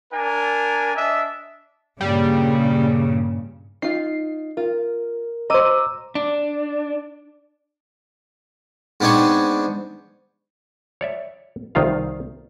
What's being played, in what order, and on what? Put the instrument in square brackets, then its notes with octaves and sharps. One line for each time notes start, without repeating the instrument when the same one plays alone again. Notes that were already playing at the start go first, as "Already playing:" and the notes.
[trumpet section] D4 A#4 G#5
D4 D#5 E5
[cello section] G2 A#2 C#3 [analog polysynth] G3
[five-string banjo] D#4 F4 [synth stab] C7
[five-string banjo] F4 [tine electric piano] A#4
[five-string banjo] F#4 D#5 [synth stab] C5 D#7 [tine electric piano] A#5 D6 E6
[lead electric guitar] D4
[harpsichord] G#2 B3 C4 D4 G#5 C#6
[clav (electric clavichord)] C#5 D5 E5
C2 D#3 F4 F5